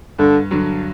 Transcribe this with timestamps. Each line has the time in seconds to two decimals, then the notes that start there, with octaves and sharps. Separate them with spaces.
0.18 G2 D3
0.51 D3 F#3